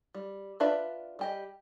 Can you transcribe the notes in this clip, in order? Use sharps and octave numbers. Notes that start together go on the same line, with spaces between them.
G3
D4 F4 B4 D5 E5
G3 G4 D#5